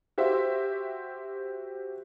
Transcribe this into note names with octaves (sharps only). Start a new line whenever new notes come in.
F#4 G4 C5 E5